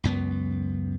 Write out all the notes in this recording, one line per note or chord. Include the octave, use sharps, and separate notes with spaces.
C#2 F#2 B3